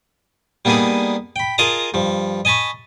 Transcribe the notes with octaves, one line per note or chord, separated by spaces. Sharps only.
G3 A#3 B3 D4 D#4 G#4
G5 B5
F4 G#4 A#4 D#5 A5 A#5
G2 F3
D#5 G#5 A5 B5 C#6